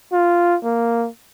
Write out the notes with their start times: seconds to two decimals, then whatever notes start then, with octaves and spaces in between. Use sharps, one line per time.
0.12 F4
0.63 A#3